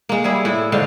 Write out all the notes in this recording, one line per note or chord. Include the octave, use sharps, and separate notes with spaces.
G#3 A#3
G3 E4 G#4
A2 E4
G#2 D3 D#3 F5